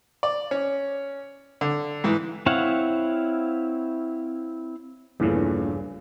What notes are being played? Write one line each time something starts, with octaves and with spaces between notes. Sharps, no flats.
D5
C#4
D3
G#2 E3
C4 E4 C#5 F5 F#5
A#1 E2 G2 C#3 E3 A3